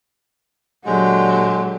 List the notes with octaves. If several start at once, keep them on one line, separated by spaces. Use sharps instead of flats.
A#2 D3 F#3 G#3 G4